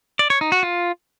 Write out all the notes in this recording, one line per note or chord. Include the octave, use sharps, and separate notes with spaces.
D5
C#5
D#4
F#4
F4